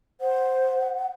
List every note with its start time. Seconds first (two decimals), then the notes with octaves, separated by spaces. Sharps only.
0.21 C5 F#5